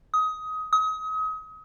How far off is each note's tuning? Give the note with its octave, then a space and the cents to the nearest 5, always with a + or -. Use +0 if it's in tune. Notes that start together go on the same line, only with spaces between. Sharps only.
D#6 +20
D#6 +35